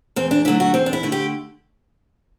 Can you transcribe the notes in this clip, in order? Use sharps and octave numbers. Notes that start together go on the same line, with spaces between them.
E2 C4
D4
D3 F#3 A3 E4
F#4
E2 C4
D4
E4
D3 A3
G4